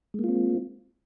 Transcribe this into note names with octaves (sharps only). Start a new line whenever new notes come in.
G#3 A#3 C4 F4